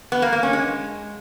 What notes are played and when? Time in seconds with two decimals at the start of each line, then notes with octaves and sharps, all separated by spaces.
0.12 B3
0.22 A#3
0.33 A#3
0.43 C#4
0.53 G#3